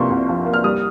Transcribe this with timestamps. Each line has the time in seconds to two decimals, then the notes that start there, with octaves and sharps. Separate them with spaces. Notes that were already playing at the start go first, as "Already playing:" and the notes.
Already playing: C2 C3 F3 A#3 C6 C#6
0.10 C2
0.29 F3
0.46 A#3
0.53 F6
0.64 G3 D#6